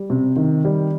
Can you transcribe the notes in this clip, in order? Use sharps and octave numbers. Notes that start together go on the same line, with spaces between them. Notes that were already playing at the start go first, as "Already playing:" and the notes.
Already playing: G3
C3
D#3
G3